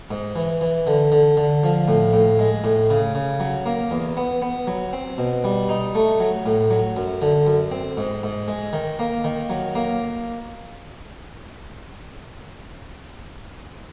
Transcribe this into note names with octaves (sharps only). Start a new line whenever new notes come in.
G#2
E3
E3
D3
D3
D3
F3
A2
A2
G#3
A2
C#3
C#3
F#3
A#3
E2
B3
B3
F#3
C4
B2
G3
D#4
A3
F#3
A2
F#3
F#2
D3
F#2
C4
G#2
G#2
G#3
D#3
A#3
D#3
F#3
A#3